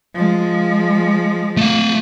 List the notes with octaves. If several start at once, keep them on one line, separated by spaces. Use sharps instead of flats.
F3 G#3
A3 F5